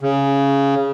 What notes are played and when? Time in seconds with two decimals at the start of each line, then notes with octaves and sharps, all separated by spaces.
0.01 C#3